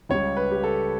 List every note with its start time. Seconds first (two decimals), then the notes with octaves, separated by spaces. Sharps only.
0.09 C#2 C#3 G3 C#5
0.37 B4
0.51 G4
0.64 A4